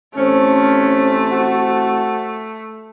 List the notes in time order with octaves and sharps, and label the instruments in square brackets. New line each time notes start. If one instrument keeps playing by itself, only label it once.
[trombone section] A1 C4 C5 [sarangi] A3 [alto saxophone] C#4
[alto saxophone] F#4